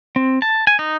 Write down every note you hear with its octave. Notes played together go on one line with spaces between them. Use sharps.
C4
A5
G#5
D#4